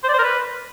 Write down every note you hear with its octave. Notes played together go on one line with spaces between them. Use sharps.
C5
D5
C5
A#4
B4